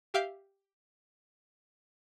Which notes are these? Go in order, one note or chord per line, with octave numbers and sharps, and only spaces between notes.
G4 E5 F5 D6 F6 G6